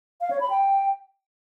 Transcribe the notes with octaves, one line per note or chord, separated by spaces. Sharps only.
F5
C#5
B5
G5